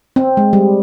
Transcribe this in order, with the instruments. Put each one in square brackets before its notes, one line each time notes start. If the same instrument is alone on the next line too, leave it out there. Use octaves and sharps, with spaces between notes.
[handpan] C4
G#3
G3